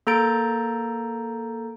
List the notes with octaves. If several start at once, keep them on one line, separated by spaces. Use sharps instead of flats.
A#3 A4 A#5 G6 A6 D7